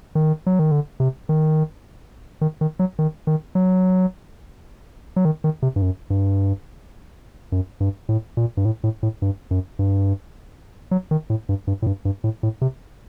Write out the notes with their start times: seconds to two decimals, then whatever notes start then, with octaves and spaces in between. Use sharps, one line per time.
0.15 D#3
0.46 F#3
0.59 D#3
0.71 D3
1.00 C3
1.29 D#3
2.41 D#3
2.61 D#3
2.79 F#3
2.99 D#3
3.27 D#3
3.55 F#3
5.16 F#3
5.25 D#3
5.44 D#3
5.62 C3
5.76 G2
5.82 F#2
6.10 G2
7.52 F#2
7.80 G2
8.09 A2
8.37 A#2
8.57 G2
8.65 A2
8.84 A2
9.03 A2
9.22 G2
9.51 F#2
9.79 G2
10.91 F#3
11.11 D#3
11.30 A2
11.49 G2
11.67 G2
11.82 A2
11.86 G2
12.05 G2
12.24 A2
12.43 A2
12.61 C3